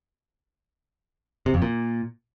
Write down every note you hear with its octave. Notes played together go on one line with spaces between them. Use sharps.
C3
F2
A#2